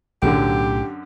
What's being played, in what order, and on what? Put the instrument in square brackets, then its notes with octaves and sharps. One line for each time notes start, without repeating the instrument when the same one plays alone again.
[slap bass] B1 A2 F#3 [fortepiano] F#2 D3 [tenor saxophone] G4